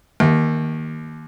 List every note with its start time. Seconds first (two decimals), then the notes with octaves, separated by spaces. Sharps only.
0.20 D#2